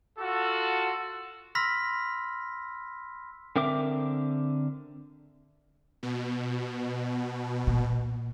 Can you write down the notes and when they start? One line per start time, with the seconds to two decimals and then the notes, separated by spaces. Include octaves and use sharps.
0.18 F4 F#4 A4
1.55 B5 C6 E6 F6 A#6 B6
3.56 D3 C4 A#4 E5 D6
6.03 B2
7.67 A#2